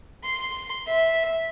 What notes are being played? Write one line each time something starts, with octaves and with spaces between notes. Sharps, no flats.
C6
E5